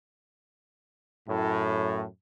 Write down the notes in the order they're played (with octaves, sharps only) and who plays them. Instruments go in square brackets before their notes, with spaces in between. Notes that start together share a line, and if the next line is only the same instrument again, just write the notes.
[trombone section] F#2 A2